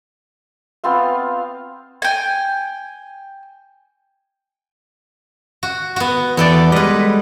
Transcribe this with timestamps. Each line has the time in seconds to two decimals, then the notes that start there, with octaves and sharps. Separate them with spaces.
0.84 B3 C4 F4 F5
2.02 G5 G#5
5.63 F#4
5.96 B3 F#4
6.37 E2 B3 A4 D5 G5
6.72 G3 G#3 B4 D#5